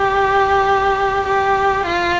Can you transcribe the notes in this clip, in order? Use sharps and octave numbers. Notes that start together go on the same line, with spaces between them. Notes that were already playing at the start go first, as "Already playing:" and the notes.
Already playing: G4
G4
F4